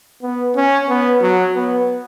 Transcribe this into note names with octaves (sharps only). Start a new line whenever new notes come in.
B3
C#4
B3
F#3
B3